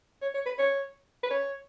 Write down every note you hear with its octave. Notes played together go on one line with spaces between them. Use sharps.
C#5
C#5
B4
C#5
B4
C#5